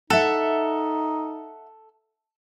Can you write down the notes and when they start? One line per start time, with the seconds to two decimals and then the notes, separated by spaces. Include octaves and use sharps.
0.10 D#4 A4 E5 F#5